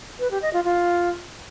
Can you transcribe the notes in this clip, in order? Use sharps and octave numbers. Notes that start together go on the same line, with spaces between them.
B4
G4
D#5
F4
F4